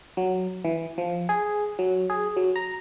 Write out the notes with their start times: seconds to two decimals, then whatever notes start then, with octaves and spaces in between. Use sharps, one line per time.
0.17 F#3
0.65 E3
0.98 F3
1.29 G#4
1.79 F#3
2.10 G#4
2.37 F#3
2.56 A#5